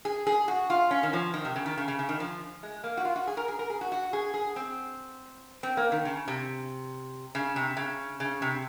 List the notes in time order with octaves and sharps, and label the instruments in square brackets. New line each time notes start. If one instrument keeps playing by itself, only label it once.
[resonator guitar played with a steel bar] G#4
G#4
F#4
F4
C#4
D#3
F3
D#3
C3
C#3
D#3
C#3
C#3
C#3
D#3
F3
G#3
A#3
F#4
F4
F#4
G#4
A#4
G#4
A#4
G#4
F#4
F#4
G#4
G#4
C4
C4
A#3
D#3
C#3
C3
C#3
C3
C#3
C#3
C3